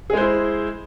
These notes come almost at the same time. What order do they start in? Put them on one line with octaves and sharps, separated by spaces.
G#4 G#3 C5 E4